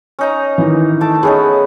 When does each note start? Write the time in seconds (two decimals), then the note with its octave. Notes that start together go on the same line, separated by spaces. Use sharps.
0.19 C#4 D#4 A#5
0.58 D#3 E3
1.01 A3 A5 D6
1.23 B3 C#4 D#4 G#4